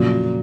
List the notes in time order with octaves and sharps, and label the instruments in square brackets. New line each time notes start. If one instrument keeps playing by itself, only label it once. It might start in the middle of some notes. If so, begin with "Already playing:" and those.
Already playing: [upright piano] F2 C#3 F#3 [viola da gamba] A#2